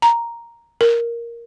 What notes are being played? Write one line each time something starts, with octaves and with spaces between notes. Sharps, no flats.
A#5
A#4